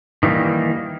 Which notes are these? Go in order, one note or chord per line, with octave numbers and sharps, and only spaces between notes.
D#3 E3 G3 A#3